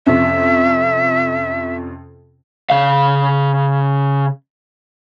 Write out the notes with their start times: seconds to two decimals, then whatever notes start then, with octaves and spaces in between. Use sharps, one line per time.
0.06 F2 C3 C#4 E5
2.70 C#3 F5